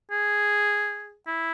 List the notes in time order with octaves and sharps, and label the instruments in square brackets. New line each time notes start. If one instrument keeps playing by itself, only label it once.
[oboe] G#4
E4